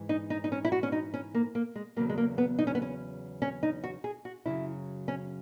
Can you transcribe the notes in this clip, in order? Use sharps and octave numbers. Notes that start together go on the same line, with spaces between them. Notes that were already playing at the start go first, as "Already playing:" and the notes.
Already playing: G#2 E3
D#4
D#4
D#4
C#4
E4
F#4
C#4
D#4
C#4
A#3
A#3
G#3
E2 C#3 F#3 A#3
G#3
A#3
B3
D#4
C#4
B3
C#4
C#4
D#4
F#4
G#4
F#4
F#2 C#3 F#3 E4
C#4